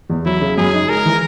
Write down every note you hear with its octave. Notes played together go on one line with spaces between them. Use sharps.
E2
F#3 E4
C#3
F#2 G#4
D#4
G#3 A#4
E3